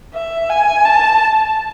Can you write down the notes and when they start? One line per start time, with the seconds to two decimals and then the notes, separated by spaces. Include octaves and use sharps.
0.14 E5
0.50 G#5
0.85 A5